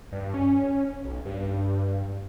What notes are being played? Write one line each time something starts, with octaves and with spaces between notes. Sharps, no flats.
G2
C#4
B1
G2